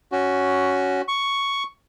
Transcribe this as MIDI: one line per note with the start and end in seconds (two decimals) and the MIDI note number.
0.12 1.01 61
0.12 1.01 66
1.08 1.63 85